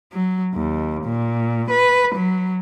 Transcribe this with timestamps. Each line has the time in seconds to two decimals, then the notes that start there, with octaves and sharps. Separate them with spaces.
0.12 F#3
0.55 D#2
1.04 A#2
1.70 B4
2.15 F#3